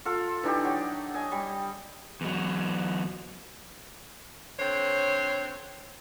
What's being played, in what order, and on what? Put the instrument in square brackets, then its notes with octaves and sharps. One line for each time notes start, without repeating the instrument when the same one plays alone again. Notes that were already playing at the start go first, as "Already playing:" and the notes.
[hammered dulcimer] F4 A4
E3 D4 D#4 G4
F#3
D#5 G#5
G3
[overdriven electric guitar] E2 F#3
[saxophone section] D3 C4 C5 C#5